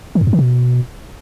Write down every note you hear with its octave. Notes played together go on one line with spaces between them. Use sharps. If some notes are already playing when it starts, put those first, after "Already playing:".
D#3
F2
G2
D#3
B2